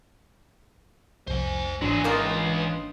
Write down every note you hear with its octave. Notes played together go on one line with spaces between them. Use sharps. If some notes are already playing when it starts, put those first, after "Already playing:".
C2 F2 C5 G#5
G#1 E3 F#3 D4 G#4 C6
C#2 D#3 A#3 D#4 F4